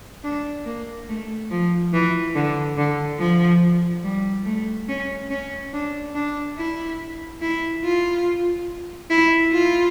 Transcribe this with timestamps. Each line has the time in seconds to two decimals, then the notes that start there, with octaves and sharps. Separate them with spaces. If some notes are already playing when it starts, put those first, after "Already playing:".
0.24 D4
0.66 A#3
1.09 A3
1.51 F3
1.93 E3
2.35 D3
2.78 D3
3.20 F3
4.04 G3
4.46 A3
4.89 C#4
5.30 C#4
5.73 D4
6.15 D4
6.58 E4
7.42 E4
7.84 F4
9.10 E4
9.53 F4